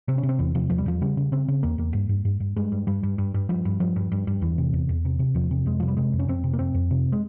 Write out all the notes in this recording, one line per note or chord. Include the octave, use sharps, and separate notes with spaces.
C3 C4
C#4
C3
C4
E2 E3
C3 F3
E2 F3
G3
E2 F3
C#3 G3
C#3
C#3 C4
C#3
E2 A#3
E2 A#3
G2
G2
G2
G2
G2 G#3
G2
G2 G3
G2
G2
G2
G2 F3
G2
G2 F3
G2
G2
G2
E2 E3
C3
E2
E2
C3
C3
E2 F3
C3
F2 G#3
C3 F3
G3
C3 G#3
F2
C#4
F2 C4
C3
A#3
F2 C4
F2
C3
G#3